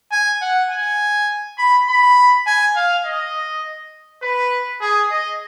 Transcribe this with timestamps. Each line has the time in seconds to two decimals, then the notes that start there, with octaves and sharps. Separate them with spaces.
0.12 G#5
0.42 F#5
0.71 G#5
1.58 B5
1.89 B5
2.47 G#5
2.76 F5
3.05 D#5
4.23 B4
4.81 G#4
5.11 D#5